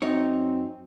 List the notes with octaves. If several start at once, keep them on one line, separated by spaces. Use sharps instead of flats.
F#2 C4 D#4 C#5